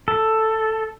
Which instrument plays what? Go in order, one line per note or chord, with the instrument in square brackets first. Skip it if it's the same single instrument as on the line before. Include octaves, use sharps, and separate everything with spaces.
[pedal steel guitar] A4